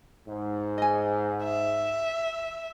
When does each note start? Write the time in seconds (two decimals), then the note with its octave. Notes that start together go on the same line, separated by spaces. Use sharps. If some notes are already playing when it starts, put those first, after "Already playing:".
0.28 G#2
0.78 D#5 G#5
1.44 E5